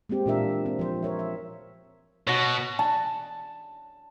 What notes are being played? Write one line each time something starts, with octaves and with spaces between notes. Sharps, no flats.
G#3 A#3 C4 G4
A#2 E3 D4 F4 A#4 E5
C4
F3 C5
A#4 C#5 E5
E5
B2 F#4 C#5
A5